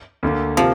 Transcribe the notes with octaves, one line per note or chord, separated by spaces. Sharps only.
D2 D3 A#3
C3 F3 A#3